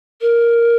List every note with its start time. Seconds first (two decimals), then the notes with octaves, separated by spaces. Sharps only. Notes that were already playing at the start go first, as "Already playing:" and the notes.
0.21 A#4